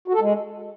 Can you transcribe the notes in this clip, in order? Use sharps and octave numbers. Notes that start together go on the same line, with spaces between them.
F#4
A4
G#3